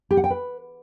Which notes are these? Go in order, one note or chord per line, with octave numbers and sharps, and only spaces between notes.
G4
F#5
G5
B4